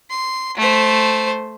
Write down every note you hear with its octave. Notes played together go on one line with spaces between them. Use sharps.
C6
A3 C5